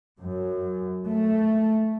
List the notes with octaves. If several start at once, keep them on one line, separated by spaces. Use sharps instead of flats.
F#2
A3